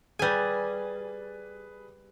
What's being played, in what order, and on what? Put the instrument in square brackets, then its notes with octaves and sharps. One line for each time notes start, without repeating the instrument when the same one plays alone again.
[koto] G3 G#5 [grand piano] G#4 B4